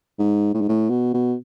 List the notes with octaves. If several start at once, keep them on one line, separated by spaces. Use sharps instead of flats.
G#2
A2
G#2
A2
B2
B2